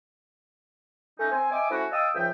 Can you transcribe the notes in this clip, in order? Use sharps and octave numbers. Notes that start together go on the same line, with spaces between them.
A3 C#4 D#4
C4 G#5
D#5 E5 G5 G#5 D6
A3 C4 C#4 E4 F#4
D#5 F5 G5 A5 D#6 E6
C#2 G#2 F3 E5 G5